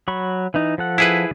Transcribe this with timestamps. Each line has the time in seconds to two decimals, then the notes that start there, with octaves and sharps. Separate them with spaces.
0.08 F#3 B5 C#6
0.54 E3 D#4
0.78 F3 A4 F#5
0.98 E4 G#4 B4